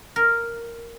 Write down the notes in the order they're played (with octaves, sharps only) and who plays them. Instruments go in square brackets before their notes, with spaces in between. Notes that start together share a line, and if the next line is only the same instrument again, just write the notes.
[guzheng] A#4